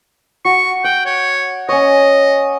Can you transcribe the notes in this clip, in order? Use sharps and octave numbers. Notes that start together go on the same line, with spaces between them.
F#4 C#6
F#5 G5
C#5
C#4 C#5 D#5